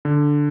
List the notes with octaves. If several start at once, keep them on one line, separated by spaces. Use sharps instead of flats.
D3